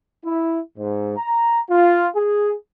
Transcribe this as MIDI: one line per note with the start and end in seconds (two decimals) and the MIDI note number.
0.24 0.59 64
0.77 1.14 44
1.17 1.59 82
1.70 2.08 65
2.14 2.55 68